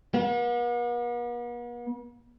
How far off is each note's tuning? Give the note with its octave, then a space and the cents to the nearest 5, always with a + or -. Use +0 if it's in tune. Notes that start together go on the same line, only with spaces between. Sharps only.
B3 -45